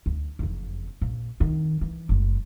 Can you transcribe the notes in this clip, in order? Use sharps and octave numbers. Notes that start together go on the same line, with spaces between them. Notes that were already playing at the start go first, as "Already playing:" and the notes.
D2
F#1 F2
A#1
F2 D#3
E3
F#1 G#3